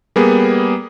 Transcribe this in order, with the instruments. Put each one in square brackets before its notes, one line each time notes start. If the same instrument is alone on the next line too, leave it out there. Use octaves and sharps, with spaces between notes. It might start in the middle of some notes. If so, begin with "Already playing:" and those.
[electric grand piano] G3 A#3 B3 G#4